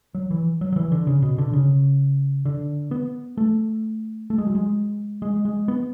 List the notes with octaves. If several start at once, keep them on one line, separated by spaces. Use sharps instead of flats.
F#3
E3
F#3
F#3
E3
D3
C#3
B2
D3
C#3
D3
B3
A3
A3
G#3
F#3
G#3
G#3
G#3
B3